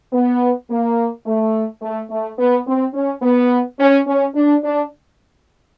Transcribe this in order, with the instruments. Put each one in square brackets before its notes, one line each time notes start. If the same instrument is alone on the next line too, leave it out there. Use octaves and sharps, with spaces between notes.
[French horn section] B3
A#3
A3
A3
A3
B3
C4
C#4
B3
C#4
C#4
D4
D4